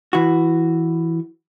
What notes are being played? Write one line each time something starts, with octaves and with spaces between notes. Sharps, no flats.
E3 F#4